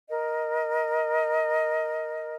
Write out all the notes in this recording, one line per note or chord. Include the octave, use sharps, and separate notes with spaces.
A#4 D#5